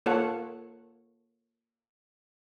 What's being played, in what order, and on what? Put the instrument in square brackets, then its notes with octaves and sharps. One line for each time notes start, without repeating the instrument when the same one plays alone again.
[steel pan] A#3 F4 A4 C#5 F#5